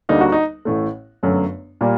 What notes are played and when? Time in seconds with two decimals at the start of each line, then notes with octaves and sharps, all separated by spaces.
0.09 D2 D3 G3 A#3 D#4
0.21 F#4
0.32 D#4
0.65 A1 A2 A3
1.23 G1 F#2 F#3 A3
1.81 A#2 G3 A#3